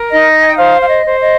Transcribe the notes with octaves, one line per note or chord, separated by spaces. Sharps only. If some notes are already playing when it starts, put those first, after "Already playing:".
Already playing: A#4
D#4 D#5
G#5
G5
C5 F5
F5
D#5
C5
D#5